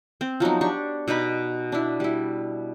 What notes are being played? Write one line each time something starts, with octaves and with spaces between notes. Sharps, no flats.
C4
F3 F#3 B3 D#4
D4 G4 C#6
B2 B3 D#4 B5
D4 E4
G3 E4